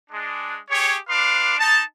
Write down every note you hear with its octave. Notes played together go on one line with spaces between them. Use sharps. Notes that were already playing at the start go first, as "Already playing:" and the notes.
G#3 D4
G4 G#4 C#5
D4 B4 F5 C6 D6
D#4 A5